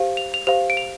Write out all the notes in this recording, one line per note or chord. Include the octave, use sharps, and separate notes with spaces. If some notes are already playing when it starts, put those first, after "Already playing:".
Already playing: G4 C5 F5
F7
F7
G4 C5 F5 F7
D7
F7